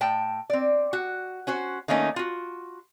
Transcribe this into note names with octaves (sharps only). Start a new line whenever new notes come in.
A2 G5 A5
C4 D5
F#4
C#4 F#4 C5
D#3 A3 A#3 C#4 D#4
F4 F#4